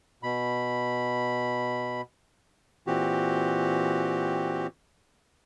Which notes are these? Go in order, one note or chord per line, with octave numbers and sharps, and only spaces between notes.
B2 B5
A#2 E3 C4 F#4 G4